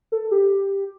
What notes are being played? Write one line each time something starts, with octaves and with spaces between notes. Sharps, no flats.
A4
G4